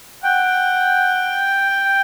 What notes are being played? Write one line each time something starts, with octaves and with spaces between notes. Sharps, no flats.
F#5 G5